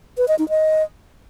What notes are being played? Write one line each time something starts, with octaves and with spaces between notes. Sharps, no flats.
B4
D#5
D#4
D#5